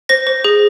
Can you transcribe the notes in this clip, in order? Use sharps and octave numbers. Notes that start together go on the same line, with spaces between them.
C5 A#6
C5
G#4